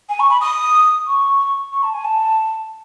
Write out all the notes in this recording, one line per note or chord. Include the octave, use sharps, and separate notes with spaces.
G#5
C#6
B5
D#6
C#6
C#6
A5
G#5
A5